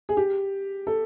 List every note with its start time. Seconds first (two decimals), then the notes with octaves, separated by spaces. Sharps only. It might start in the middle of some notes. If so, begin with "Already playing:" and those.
0.09 G#4
0.17 G4
0.87 A4